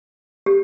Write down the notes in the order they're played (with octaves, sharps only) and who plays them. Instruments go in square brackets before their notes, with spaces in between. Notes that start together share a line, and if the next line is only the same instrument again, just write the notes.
[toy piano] G4